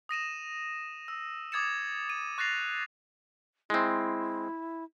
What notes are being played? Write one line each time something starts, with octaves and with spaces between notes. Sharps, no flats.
D#6 A#6 D#7 E7
E6
D6 D#6 G#6 A6 C#7 E7
D#7
C#6 F#6 A6 A#6 C7 F7
G#3 C4 E4